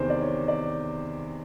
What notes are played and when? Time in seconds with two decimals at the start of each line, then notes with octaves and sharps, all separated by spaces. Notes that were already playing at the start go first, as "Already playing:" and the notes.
Already playing: E2 C3 D#3 C5
0.10 D5
0.21 C#5
0.48 D5